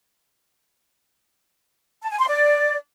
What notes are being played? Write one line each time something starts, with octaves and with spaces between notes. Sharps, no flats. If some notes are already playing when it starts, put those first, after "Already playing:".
A5
G#5
C6
D5